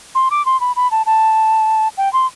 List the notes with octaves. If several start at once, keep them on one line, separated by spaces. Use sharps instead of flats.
C6
D6
C6
B5
B5
A5
A5
G5
C6